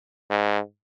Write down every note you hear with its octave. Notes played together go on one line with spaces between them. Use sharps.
G#2